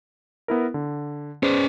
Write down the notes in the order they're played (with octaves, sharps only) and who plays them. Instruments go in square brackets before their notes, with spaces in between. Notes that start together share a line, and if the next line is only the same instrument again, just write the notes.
[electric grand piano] B3 E4 A#4
D3
[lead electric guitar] C#4 D5 [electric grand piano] G#4 B4 C5